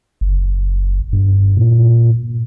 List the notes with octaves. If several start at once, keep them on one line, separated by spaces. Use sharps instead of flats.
F#1
G2
A#2